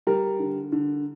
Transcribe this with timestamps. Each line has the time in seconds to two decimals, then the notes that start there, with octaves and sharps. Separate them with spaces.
0.07 G3 A#4
0.39 D3
0.72 D3